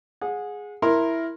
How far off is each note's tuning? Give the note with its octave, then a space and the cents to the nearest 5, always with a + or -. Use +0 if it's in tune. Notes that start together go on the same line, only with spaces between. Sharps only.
G#4 +0 F#5 -30
E4 +0 A#4 +0 C6 +10